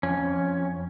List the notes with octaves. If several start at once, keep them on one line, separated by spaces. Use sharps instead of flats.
F2 C#4